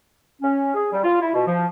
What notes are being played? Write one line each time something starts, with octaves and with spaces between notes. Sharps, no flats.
C#4
G#4
G3
F4
E4
B2
F3